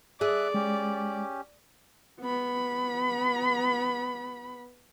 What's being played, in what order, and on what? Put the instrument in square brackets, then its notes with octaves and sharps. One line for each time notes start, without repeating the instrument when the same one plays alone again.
[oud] G#4 [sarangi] D5 [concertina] E5 F#6
[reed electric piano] G#3 [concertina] C#4 G4
[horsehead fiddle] B3 B5